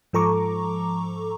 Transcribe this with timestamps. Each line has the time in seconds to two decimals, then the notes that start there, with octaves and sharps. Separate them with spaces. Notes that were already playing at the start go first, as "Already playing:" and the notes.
0.13 G#2 F3 A4 A#5 C#6 D6